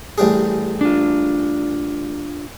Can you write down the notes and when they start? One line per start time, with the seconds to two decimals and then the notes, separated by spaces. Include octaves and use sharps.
0.18 A1 G3 G#4
0.81 D4 F4